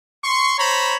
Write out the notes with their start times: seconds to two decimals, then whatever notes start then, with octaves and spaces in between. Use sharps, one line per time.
0.24 C6 C#6
0.58 C5 C#5 A#5 B5